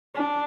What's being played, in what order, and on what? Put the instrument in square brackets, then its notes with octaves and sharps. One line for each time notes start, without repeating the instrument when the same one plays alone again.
[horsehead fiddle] D4